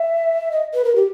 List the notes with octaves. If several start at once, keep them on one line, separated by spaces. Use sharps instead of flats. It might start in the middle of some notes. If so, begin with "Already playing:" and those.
Already playing: E5
D#5
B4
A#4
G4